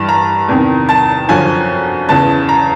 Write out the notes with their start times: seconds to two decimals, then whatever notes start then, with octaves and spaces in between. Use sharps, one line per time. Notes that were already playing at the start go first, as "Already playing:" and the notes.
Already playing: G2 E3 A5
0.09 A#5
0.48 E2 C3 D#3
0.89 A5
1.29 F#2 D3 F3 G#5
2.09 E2 C#3 E3 A5
2.49 A#5